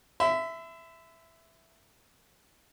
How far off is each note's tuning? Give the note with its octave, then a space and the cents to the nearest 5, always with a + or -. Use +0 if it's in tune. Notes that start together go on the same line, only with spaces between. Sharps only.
E5 +0 B5 +45